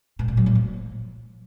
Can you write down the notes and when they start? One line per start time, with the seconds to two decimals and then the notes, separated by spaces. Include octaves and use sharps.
0.19 B2
0.28 A#2
0.37 F#3
0.46 A#2
0.55 F3